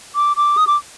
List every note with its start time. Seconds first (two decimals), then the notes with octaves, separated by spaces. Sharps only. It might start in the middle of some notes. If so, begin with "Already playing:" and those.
0.16 D6
0.37 D6
0.57 D#6
0.67 D6